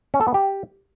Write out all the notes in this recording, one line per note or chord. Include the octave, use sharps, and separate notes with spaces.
C#4
A4
B3
G4